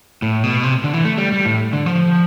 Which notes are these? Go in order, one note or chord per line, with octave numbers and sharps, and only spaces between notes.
A2
B2
C3
D3
E3
A3
G3
G3
A2
D3
F3